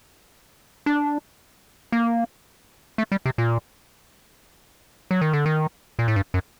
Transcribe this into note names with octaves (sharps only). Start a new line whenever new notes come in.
D4
A#3
A3
G3
C3
A#2
F#3
D#3
D3
D#3
A#2
A2
G2
F#2